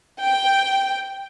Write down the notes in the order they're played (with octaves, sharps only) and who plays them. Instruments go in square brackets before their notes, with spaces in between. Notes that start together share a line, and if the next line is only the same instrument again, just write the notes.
[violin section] G5